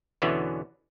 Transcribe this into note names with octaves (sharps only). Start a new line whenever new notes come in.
E2 B2 D3 E3 B3 C#4